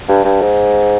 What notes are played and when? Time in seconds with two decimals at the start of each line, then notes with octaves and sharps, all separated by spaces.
0.08 G2
0.25 G2
0.41 G#2